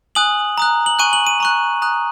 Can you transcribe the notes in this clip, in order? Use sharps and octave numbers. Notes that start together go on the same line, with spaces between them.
G#5 D#6 F#6 F#7
A#5 D#6 F#6
F#7
G#5 C#6 F#6 D#7
F#7
D#7
A#5 C#6 F#6
A#5 D#6 F#6